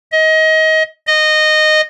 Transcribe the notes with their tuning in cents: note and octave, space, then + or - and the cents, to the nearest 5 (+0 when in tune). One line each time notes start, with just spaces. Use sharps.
D#5 +25
D#5 -15